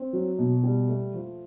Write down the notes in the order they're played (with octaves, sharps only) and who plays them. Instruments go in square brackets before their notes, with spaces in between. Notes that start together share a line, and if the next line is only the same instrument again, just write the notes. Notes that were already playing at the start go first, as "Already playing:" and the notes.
Already playing: [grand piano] C4
F#3
B2
G3
A3
F3